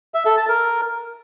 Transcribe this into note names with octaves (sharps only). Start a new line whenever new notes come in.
E5
A4
A5
A#4